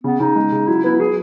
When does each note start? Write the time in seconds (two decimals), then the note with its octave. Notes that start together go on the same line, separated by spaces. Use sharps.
0.04 C#3 B3
0.20 C#3 D#4
0.36 G#3
0.52 C#3
0.68 F#3 E4
0.84 B3 E4
1.00 F#3 G#4